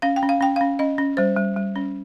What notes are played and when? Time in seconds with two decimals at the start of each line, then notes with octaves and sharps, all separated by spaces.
0.02 C#4 F5
0.16 G5
0.23 C#4
0.29 F5
0.41 C#4 G5
0.56 C#4 F5
0.79 C#4 D#5
0.98 C#4
1.17 G3 C5
1.37 G3
1.56 G3
1.76 C#4